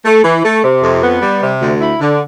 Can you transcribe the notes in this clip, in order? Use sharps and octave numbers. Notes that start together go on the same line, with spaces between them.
A3
E3
A3
C3
F2
B3
G3
C3
D2
E4
D3